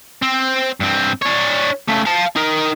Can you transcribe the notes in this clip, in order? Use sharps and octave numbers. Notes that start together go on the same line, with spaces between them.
C4
G2 C4
D4 C#5
C#3 A3
F5 A5
D#4 A#4